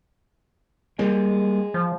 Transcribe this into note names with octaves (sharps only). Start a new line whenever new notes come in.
G3 G#3 A#3
F3